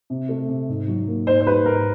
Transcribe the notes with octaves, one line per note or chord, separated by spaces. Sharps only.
C3
A3
C3
G#2
F#3
A#3
G#2 C5
C5
G3 B4
G#2 A#4